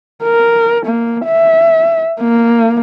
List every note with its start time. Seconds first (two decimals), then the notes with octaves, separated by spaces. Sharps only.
0.23 A#4
0.86 A#3
1.26 E5
2.21 A#3